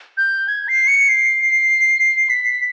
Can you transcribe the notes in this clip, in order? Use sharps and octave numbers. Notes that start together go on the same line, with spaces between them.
G6
G#6
C7
C#7
C7
B6